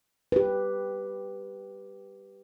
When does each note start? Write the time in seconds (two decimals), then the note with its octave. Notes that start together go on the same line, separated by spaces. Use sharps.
0.32 G4 B4